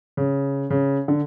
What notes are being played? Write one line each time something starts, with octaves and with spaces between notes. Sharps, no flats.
C#3
C#3
D3